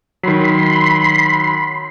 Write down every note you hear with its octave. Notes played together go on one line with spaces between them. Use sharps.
D#3 F#3 B5 C6